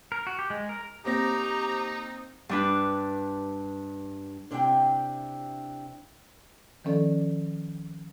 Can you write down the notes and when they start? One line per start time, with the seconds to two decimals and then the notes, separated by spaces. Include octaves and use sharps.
0.12 A#4
0.27 F#4
0.39 G4
0.50 G#3
0.69 A#4
1.05 A#3 C4 D#4 G4 A#5 A#6
2.49 G2 D4 B4
4.51 C3 D4 E4 G4 F5 G5
6.84 D#3 F3 C#4 A4 D5